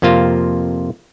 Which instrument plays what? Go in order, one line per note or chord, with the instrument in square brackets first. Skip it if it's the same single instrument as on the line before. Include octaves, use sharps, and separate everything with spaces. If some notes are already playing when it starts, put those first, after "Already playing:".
[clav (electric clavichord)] F2 C3 A#3 F4